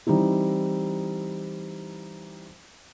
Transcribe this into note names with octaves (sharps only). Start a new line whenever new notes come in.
E3 G3 C4 D#4 E4